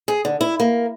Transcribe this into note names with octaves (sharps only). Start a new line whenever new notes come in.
G#4
D3
E4
A#3